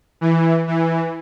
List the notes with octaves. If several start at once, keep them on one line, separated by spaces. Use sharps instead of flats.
E3
E3